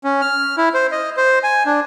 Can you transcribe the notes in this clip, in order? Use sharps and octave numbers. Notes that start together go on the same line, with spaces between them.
C#4
F6
E4
C5
D#5
C5
G#5
D4